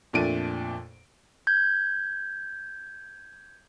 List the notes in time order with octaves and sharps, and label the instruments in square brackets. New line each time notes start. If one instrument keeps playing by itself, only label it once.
[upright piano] F2 A#2 A3 D4 D7 D#7
[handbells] G6 G#6